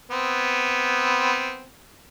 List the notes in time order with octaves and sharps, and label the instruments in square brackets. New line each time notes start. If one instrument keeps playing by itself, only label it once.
[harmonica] B3 C4